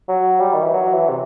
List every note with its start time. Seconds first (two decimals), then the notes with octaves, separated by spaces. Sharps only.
0.08 F#3
0.40 G3
0.54 D#3
0.63 E3
0.73 F#3
0.94 E3
1.09 C3